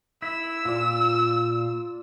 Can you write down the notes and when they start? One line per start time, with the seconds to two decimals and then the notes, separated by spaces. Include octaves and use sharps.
0.22 E4 E6
0.65 A#2 F4 D5